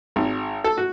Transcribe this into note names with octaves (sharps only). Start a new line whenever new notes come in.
G#1
A4
F#4